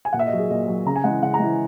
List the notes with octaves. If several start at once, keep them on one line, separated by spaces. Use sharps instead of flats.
G#5
A#2 F#5
E5
D#5
F#3
G#4
A#2 D#5
F#3
C#3 A#5
G#5
E3 G#3 F#5
C#3 F#5
A#5
E3 G#3